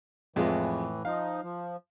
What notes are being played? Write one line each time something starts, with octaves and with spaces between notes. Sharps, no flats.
F2 A2 E3 G#3 F4
F3 D#4 F5
F3